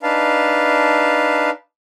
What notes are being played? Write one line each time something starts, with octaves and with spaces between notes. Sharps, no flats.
D4 D#4 B4 F5 A5